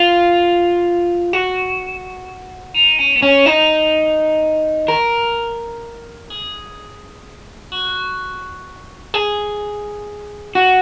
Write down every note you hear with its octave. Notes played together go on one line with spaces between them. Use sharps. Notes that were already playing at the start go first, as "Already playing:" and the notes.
Already playing: F4
F#4
D#4
C#4
B3
C#4
D#4
A#4
G#4
F#4
G#4
F#4